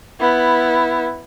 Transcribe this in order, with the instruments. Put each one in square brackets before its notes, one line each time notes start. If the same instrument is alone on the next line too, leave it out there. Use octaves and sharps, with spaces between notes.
[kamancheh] B3 E4